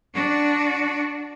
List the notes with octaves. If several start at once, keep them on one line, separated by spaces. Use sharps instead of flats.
D4 F#4